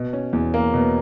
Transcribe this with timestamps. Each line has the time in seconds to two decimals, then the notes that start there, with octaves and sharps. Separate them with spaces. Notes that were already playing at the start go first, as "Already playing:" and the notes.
Already playing: B2
0.13 C#4
0.33 E2
0.54 A#3
0.74 B2